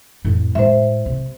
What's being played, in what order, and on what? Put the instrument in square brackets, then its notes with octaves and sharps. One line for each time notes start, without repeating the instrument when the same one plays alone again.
[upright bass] F2 A2
[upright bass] A2 G#3 [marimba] C5 E5
[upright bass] C3